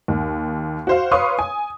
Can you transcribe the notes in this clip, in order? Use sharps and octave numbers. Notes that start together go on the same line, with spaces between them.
D#2
F#4 C5 F5
B4 C#5 F5 C6 C#6 D#6
G#5